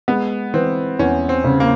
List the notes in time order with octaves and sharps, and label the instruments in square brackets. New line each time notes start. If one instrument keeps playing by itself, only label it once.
[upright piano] G#3 [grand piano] B3
[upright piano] E3 [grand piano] C4
[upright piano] E2 [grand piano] C#4
[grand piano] C4
[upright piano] C#3
[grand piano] A#3